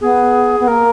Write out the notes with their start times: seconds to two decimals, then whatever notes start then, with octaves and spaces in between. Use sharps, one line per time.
0.01 B3 G#4
0.60 B3
0.68 A#3 A#4